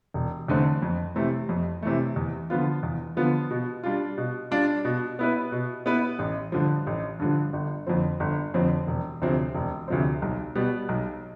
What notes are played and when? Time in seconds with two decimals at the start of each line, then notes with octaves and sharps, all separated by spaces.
0.14 E1
0.48 E2 D3 A3 C4
0.82 F2
1.16 C3 E3 A3
1.49 F2
1.82 C3 E3 A3
2.16 E2
2.50 D3 F3 B3 F4
2.83 E2
3.17 D3 F3 B3 F4
3.51 B2
3.83 G3 D4 F4
4.18 B2
4.51 G3 D4 F4
4.85 B2
5.19 B3 E4 B4
5.52 B2
5.86 B3 E4 B4
6.19 A1
6.52 G2 D3 F3
6.87 A1
7.20 G2 D3 F3
7.53 G1
7.87 F2 D3 F3 C4
8.20 G1
8.54 F2 D3 F3 C4
8.87 E1
9.22 D2 C3 F3 C4
9.55 E1
9.88 D2 C3 F3 C4
10.22 B1
10.55 B2 G3 B3
10.89 B1